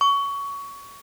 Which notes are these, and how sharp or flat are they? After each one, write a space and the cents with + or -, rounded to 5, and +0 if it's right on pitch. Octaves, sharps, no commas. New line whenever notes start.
C#6 +20